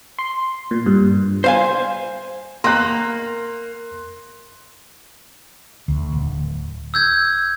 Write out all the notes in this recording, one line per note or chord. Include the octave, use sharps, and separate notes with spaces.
C6
A#2
G2
C5 F5 G#5
A#3 C6 F#6
D2
D1
E6 G6 G#6